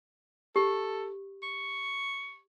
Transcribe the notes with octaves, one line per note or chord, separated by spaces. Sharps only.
G4 A4
C#6